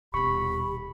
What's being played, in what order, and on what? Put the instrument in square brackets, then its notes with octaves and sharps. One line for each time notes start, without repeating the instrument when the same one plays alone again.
[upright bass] D#1 B2 [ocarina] G4 [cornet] B5 [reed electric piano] C#6